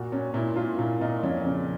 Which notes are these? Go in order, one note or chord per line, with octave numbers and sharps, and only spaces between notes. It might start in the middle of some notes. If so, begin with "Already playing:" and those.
Already playing: A#2 F#4
A#2 C#4
A#2 E4
A#2 F4
A#2 E4
A#2 D#4
F2 C#4
C#3